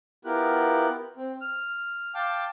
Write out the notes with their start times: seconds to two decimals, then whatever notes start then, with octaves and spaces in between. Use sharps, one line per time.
0.25 B3 E4 F4 G4 A#4 F#6
1.17 C4
1.41 F6
2.15 F5 G5 A5 D6